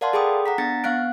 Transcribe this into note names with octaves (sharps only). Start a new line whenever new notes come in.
A#4 D5 F5 F#5 A5 C6
G#4 A4 G5 B5 D6 D#6
F#5 A#5 B6
B3 D4 A6 A#6 C#7
B3 C4 F5 F#5 F#6 D7